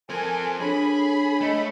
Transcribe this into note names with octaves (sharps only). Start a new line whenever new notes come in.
F3 C4 A4 A#4 G#5 A5
D4 G#4 C#5 B5
A3 D#5